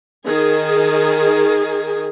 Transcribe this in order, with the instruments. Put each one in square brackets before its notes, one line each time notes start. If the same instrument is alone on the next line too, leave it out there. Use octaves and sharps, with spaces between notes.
[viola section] D#3 G#4